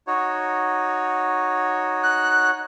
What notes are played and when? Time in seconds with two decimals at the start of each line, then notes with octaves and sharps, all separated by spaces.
0.07 D#4 F#4 C#5
2.03 F#6